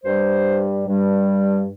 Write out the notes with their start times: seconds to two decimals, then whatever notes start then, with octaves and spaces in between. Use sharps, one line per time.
0.04 G2 G3 C5
0.87 G2 G3